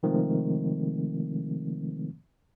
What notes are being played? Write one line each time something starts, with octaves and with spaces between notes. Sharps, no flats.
C3 D#3 F3 G#3 A3 C4